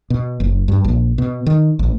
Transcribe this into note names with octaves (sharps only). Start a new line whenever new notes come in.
B2
F#1
G2
A#1
B2
D#3
A1